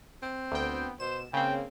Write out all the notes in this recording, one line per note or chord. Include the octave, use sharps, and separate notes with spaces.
C4
D2 B3 G5
B2 C5 E7
C#3 A#3 C4 G5